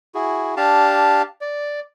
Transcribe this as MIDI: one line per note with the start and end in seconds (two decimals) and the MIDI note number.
0.15 0.55 64
0.15 0.55 66
0.15 0.55 68
0.57 1.22 62
0.57 1.22 67
0.57 1.22 77
0.57 1.22 81
1.41 1.80 74